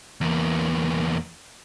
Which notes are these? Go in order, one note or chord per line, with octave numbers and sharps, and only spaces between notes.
E2 A#3